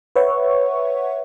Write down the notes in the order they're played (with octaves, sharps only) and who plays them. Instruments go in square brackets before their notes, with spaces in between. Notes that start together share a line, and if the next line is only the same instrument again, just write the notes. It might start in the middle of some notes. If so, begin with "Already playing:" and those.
[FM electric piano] B4 C#5 E5 F#5 C#6